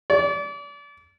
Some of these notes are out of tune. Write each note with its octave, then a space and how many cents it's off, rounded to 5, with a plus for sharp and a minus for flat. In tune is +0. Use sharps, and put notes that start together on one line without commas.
D5 -35